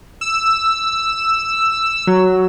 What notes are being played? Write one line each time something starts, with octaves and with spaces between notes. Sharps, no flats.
E6
F#3